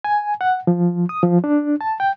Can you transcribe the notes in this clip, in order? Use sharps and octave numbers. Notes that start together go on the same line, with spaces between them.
G#5
F#5
F3
D#6
F3
D4
A5
G5